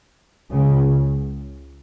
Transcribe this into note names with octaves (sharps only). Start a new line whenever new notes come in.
C#2 C#3